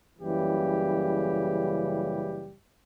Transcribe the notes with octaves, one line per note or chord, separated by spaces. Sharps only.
F#1 C#3 E3 G3 G4